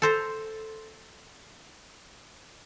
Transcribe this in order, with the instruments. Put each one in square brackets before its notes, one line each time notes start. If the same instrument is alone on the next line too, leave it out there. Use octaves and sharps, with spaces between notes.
[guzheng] A4 C5 A#5